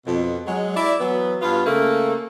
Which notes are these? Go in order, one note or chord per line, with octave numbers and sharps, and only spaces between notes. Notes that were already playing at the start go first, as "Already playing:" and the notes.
F2 B2
F#3 G#3
E4 D5
E3 F#3 B3
G2 B3 F4
C#3 A3 A#3